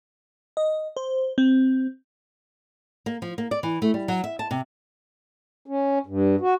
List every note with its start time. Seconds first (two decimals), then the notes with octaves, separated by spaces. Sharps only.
0.57 D#5
0.97 C5
1.38 C4
3.06 A#3
3.22 F3
3.38 A#3
3.51 D5
3.63 E3
3.82 A3
3.94 G3
4.08 F#3
4.24 E5
4.39 A5
4.51 C3
5.66 C#4
6.06 G2
6.41 F#4